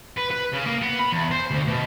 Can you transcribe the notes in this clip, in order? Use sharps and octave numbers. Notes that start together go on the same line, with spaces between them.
B4
B4
C#3
A#3
B3
B5
E2
C5
D2
B2